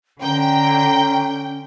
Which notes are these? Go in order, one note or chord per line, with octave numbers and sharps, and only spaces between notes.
D3 C#4 G5 A#5